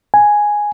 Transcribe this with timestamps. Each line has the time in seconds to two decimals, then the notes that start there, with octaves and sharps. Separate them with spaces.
0.14 G#5